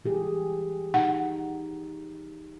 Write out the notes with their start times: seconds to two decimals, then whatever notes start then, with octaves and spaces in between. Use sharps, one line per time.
0.05 E3 G4 G#4
0.94 D#4 F#5